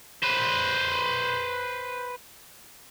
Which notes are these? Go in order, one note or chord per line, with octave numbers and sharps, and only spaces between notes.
B4 C5